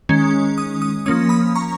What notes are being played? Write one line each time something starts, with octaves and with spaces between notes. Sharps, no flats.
D#3 G#3 C#4
D#6
D#6
F3 A#3 C#4 D#6
B5 D#6
A#5 C#6